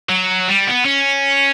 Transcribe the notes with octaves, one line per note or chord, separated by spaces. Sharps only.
F#3
G3
B3
C#4